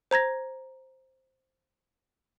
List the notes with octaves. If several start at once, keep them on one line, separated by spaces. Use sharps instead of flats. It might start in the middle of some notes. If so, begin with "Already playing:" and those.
C5 A#5 G#6 A#6